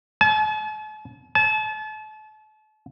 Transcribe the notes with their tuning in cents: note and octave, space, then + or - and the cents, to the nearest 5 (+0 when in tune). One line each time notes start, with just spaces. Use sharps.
A5 -45
A5 -35